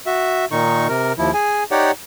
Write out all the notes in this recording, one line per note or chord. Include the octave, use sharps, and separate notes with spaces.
F#4 E5
A#2 D#3 D#4 C#6
C3 A#4
D#2 F3 E4
G#4 G#5
D#4 G4 C#5 D5 F#5